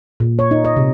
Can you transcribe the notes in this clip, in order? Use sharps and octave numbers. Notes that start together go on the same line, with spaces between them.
A#2
C#5
D#4
D#5
C3